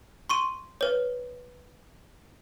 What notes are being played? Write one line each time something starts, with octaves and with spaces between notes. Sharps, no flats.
C6 C#6 D#7
B4 C#5